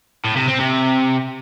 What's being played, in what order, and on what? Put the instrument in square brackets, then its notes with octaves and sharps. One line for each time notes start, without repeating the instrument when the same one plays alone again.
[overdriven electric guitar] A2
C3
C4
C3